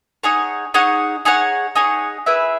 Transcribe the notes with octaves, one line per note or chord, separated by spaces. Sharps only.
D#4 G#4 C#5 F#5
D#4 G#4 C#5 F#5
D#4 G#4 C#5 F#5
D#4 G#4 C#5 F#5
E4 G#4 B4 E5